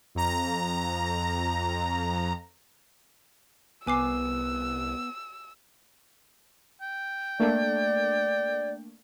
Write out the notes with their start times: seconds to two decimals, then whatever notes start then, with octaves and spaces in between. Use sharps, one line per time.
0.15 F2 A#5
3.87 C2 B3 G#5 D6 E6 C7
6.81 G5
7.40 A3 A#3 D4 D5